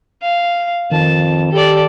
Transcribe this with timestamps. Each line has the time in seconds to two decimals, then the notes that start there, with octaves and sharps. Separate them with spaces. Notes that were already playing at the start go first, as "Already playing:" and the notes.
0.23 F5
0.92 F2 D#3 A5
1.52 G4 A4 D5